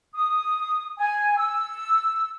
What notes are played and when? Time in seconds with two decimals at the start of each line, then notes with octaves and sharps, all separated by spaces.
0.13 D#6
0.98 G#5
1.37 E6